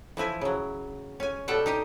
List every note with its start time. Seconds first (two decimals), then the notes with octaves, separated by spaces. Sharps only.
0.17 E3 F3 E4 G#5
0.41 C#3 F#3
1.20 C#4 G#5
1.48 B2 G3 A4 F#5 G5
1.66 D#4 G4 D#5